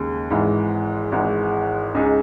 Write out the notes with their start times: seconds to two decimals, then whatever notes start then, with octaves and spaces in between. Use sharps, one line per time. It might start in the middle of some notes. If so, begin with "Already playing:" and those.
Already playing: D#2 C#3 G#3
0.30 G#1 G#2 E3 G#3
1.12 G#1 G#2 E3 G#3
1.95 C#2 C#3 G#3 D#4 G#4